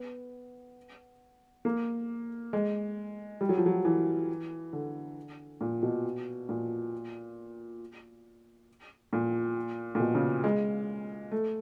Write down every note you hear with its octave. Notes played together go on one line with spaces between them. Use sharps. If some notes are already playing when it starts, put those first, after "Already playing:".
Already playing: B3
A#3
G#3
G3
F#3
F3
F#3
E3
D3
A#2
B2
A#2
A#2
A#2
B2
C#3
G#3
A3